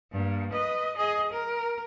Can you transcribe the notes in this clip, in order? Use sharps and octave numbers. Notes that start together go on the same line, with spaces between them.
G2 A#3
B4 D#5
G#4 D#5
A#4